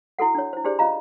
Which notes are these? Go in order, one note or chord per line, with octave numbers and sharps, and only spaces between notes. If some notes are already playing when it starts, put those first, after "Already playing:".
E4 F#4 A4 F#5
D4 C#5
E4 C5
D4 G4 G#4 C5 D5
C#4 F4 D#5 F5 A#5